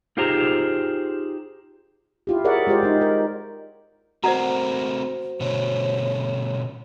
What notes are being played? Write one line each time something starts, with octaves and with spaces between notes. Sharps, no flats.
D#4 F4 G4 G#4 C5 A#5
E4 F4 G4
G#4 A#4 C#5 D5 E5 F#5
G#3 F4 G4 C5 D5
G#3 D#4
A#4
A3 C4 F#4 A#4 C5 D5 F#5 A#5
B2 D3 A3 C#5